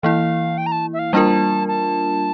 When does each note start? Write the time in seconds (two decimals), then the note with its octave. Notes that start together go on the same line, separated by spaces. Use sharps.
0.03 E3 A#3 E4 F5
0.58 G5
0.66 A#5
0.72 A5
0.93 E5
0.99 F5
1.13 G3 A#3 D4 F4 A#4 A5
1.68 A5